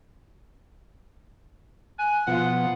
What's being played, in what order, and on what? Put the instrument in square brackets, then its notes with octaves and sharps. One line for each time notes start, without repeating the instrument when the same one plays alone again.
[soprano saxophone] G#5 [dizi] F#6
[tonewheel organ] B2 F3 B3 [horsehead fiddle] F4 [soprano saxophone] F#5